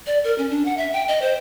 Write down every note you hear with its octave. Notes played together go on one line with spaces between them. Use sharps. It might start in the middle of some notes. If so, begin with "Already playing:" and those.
D5
A#4
C#4
D4
F#5
E5
G5
D#5
C5